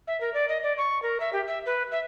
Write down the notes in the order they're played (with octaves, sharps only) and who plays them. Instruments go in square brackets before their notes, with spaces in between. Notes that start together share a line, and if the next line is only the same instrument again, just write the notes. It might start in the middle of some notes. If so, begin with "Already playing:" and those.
[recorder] E5
A#4
D5
D#5
D5
C#6
A#4
E5
G4
E5
B4
E5